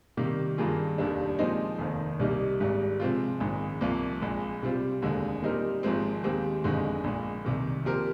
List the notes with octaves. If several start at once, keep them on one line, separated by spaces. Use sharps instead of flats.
C3 D#3 G3 A#3
G2 D#3 A#3 F4 G#4
F1 D#2 D#3 G3 D4
A#2 F3 G#3 C4 D#4
F1 D#2 D#3
C2 C3 G3 A#3 D#4
G#1 G#2 G3
C3 F3 G#3 C4 F4
A#1 G#2 D#3
C2 C3 F3 A#3
A#1 A#2 G#3
C3 G3 C4 F4
F1 D#2 D3 G#3
A#2 G3 C4 D#4 A#4
G#1 G#2 F3 G#3 C4
D#2 D#3 G#3 C4 G4
G1 F2 D3 G#3 D#4
A#1 A#2 G#3
C2 C3 D#3
A#2 F3 C4 G4 A#4